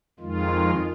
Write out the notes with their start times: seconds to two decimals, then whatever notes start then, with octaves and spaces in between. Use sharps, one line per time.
0.20 F2 D#3 G#3 F4